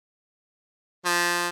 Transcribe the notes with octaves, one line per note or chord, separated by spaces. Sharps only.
F3